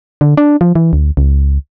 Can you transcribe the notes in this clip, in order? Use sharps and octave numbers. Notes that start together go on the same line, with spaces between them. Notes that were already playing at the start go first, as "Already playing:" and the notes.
D3
D4
F3
E3
D2
C#2